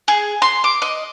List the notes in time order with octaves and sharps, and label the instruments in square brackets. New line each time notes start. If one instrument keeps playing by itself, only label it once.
[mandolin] G#4
C6
D6
D#5